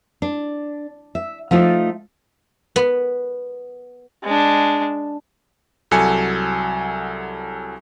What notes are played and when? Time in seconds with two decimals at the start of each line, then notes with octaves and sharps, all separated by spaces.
0.22 D4
1.15 E5
1.51 F3 A3 D#4 F4
2.76 B3
4.24 G#3 D4
5.91 C2 F#3 A4 G#5 C#7